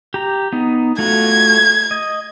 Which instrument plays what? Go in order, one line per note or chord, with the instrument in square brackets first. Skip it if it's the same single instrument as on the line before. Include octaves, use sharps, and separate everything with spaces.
[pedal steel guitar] G4 A#5
B3 D#4
[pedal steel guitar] A3 F4 F#4 [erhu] G#6
[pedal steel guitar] D#5